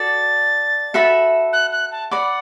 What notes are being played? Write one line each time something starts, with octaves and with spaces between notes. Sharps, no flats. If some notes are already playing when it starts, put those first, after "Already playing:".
Already playing: F#4 A4 D5 A6
F#4 A4 E5 B5
F#6
F#6
A5
D5 F#5 B5 D6